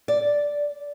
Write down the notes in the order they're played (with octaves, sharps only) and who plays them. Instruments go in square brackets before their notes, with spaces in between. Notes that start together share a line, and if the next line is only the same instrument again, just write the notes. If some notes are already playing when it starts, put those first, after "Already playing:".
[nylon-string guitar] D5